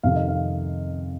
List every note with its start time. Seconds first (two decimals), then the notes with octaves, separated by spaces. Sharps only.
0.03 F2 C3 D#3 F5
0.16 D#5
0.28 F5